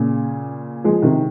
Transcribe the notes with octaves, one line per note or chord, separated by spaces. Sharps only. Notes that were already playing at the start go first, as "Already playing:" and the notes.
Already playing: A#2 C#3
F3 G#3
C3 D#3